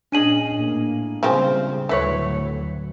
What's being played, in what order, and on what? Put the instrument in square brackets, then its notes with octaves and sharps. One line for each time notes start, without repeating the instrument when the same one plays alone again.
[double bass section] A#2 [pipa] C#4 G#4 D#5 [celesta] D4 D#7 F#7
[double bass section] A2 A#3
[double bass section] C#3 G3 [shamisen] F3 G#3 C4
[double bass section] D2 A2 F#3 [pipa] E3 B4 C#5 [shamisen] A3